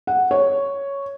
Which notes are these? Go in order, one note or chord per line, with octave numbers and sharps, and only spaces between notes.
F#5
C#5